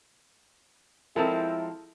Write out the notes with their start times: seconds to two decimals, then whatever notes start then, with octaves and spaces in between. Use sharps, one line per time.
1.16 F3 G#3 C4 E4 A4 A#4 A5